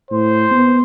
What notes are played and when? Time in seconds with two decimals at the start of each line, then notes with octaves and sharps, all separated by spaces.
0.11 A2 C5
0.51 B3